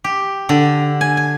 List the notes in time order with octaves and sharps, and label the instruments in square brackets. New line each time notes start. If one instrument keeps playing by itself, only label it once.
[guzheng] G4
D3
G#5
G#5